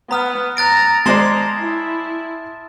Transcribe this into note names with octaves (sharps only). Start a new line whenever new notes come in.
B3 A#5 D#6 F6
A#5 F#6 A6 D7
G#3 C5 D5 A5 A#5 C6 E7
E4